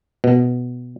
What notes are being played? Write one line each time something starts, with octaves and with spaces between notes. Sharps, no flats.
B2